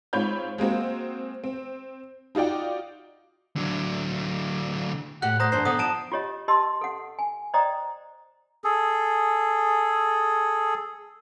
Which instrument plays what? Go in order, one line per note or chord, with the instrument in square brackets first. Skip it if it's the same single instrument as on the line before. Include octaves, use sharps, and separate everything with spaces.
[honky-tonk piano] G#2 C4 F4 C#5 B5 G6
G#3 A#3 C4 F#4
C4
D#4 F4 F#4 D5 G5
[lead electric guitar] D3 F#3
[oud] A2 F#4 G4 [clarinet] F#5 [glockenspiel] F#6
[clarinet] C5 [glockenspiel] A#5 D#6 A#6
[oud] E2 G2 D4 [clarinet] C5 [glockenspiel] C7
[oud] D3 [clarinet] B3 [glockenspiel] D#6
[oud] F3 [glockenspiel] A5 D7 E7
[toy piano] F4 G4 C#5 D#5
G4 D#5 A5 C6 E6
A4 F#5
G#5
C5 D5 D#5 G5 A#5 D#6
[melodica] G#4 A4